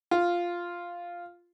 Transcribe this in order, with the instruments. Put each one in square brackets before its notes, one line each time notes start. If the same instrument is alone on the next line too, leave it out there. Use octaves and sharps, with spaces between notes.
[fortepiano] F4